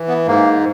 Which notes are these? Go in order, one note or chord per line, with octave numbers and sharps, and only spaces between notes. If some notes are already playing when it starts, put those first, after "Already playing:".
Already playing: E3
B3
G#2 A#3